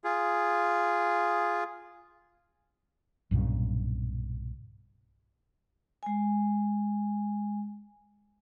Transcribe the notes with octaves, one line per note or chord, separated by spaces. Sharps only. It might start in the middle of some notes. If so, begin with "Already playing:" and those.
F4 G#4
B1 G2 A#2 C#3
G#3 G#5